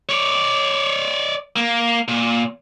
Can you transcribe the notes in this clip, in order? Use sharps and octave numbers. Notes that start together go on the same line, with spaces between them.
C#5 D5
A#3
A#2